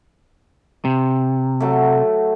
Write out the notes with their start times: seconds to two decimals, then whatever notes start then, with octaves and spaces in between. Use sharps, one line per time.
0.85 C3
1.60 F#3 A3